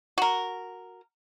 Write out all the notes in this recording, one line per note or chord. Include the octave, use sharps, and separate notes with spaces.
F#4 A#4